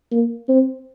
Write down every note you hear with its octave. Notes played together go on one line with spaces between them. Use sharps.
A#3
C4